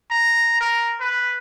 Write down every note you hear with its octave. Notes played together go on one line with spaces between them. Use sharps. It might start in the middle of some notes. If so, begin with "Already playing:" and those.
A#5
A#4
B4